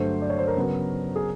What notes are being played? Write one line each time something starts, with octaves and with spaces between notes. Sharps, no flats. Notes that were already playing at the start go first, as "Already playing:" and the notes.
Already playing: G2 D3 F#3 A3 C5
D5
C#5
C5
A#4
C#3 F#3 B3
G#4